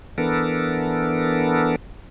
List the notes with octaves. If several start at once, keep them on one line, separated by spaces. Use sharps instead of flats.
E3 B3 D4 A4 A#4